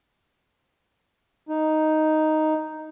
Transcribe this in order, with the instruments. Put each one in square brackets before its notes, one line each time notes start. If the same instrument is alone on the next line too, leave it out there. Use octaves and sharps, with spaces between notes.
[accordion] D#4